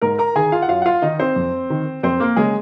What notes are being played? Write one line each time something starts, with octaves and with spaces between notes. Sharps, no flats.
G#2 A#4 A#5
A#4 A#5
D#3 G#4 G#5
F4 F5
F#5
F#2 F4 F5
F#5
F4 F5
D#3 D#4 D#5
C4 C5
F2
D#3
F2 C4 C5
A#3 A#4
C#3 G#3 G#4